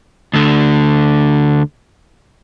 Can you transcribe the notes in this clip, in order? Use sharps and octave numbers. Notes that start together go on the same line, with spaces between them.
D2 D3